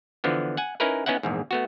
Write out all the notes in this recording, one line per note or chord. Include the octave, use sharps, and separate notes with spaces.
D3 E3 F3 B3
F#5 G#5
C#4 D#4 E4 A#4 B4
B3 C#4 D#4 E4 F#5
A#1 E2 G#2
A3 B3 F#4